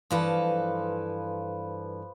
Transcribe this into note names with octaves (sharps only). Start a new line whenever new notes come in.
G2 E3 F3 A4 B4